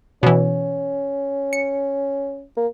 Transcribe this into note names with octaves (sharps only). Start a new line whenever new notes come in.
B2 E3 C#4
C#7
A#3